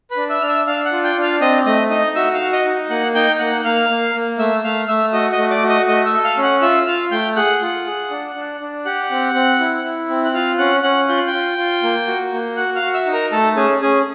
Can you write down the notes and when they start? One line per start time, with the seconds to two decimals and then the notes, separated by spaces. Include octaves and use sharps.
0.11 B4 B5
0.17 D4
0.29 E5 E6
0.41 D4 F6
0.48 E5 E6
0.67 D4 F5 F6
0.85 F#5 F#6
0.92 F4
1.04 G5 G6
1.17 D4
1.22 F5 F6
1.41 C4 D#5 D#6
1.66 A3 D#5 D#6
1.90 D#4 D#5 D#6
2.15 F#4 E5 E6
2.34 F5 F6
2.41 F#4
2.53 D#5 D#6
2.66 D#4
2.90 A#3 F#5 F#6
3.14 D#4 G5 G6
3.39 A#3 F#5 F#6
3.64 A#3 F5 F6
3.89 A#3
4.15 A#3
4.38 A3 E5 E6
4.64 A3 F5 F6
4.88 A3 E5 E6
5.13 F#4 D#5 D#6
5.32 D#5 D#6
5.38 A3
5.51 D5 D6
5.63 F#4
5.69 D#5 D#6
5.87 A3 D#5 D#6
6.06 E5 E6
6.13 A4
6.24 F5 F6
6.38 C#4
6.43 F#5 F#6
6.62 F4 E5 E6
6.86 F4 F5 F6
7.11 A3 G5 G6
7.36 G#4 F#5 F#6
7.62 F4
7.87 G#4
8.10 D4
8.35 D4
8.61 D4
8.85 G4 F#5 F#6
9.11 C4
9.35 C4
9.60 E4
9.84 E4
10.10 C4
10.25 F#6
10.34 F4 F5 F6
10.58 C#4 F#5 F#6
10.83 C#4 F#5 F#6
11.09 F4 G6
11.17 F#6
11.27 G5 G6
11.33 F4
11.58 F4
11.83 A#3
12.07 F#4
12.33 A#3
12.57 F#4 F#5 F#6
12.75 F5 F6
12.82 F#4
12.94 E5 E6
13.06 D#4
13.13 A#4 A#5
13.31 A3 A4 A5
13.56 C#4 G#4 G#5
13.82 C#4 G#4 G#5